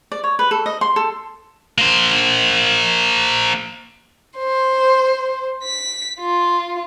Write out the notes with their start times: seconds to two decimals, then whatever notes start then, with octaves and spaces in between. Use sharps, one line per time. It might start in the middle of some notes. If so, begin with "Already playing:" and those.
0.12 D5
0.24 C#5
0.39 B4
0.51 A4
0.66 D#5
0.81 C6
0.96 A4
1.78 A#3 C5
4.37 C5
5.64 B6
6.20 F4